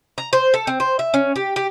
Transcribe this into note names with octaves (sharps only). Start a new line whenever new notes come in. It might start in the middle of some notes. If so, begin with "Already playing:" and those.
A#5
C5
A4
C4
C5
E5
C#4
G4
G4